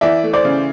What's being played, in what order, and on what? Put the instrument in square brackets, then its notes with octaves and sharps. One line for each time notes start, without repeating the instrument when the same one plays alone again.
[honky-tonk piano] E3 [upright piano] D5 E5
[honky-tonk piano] A3
[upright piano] C5 D5
[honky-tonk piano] C#3